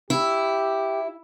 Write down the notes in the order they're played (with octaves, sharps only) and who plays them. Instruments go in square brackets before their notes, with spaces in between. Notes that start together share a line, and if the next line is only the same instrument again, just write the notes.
[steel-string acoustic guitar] E4 [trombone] G4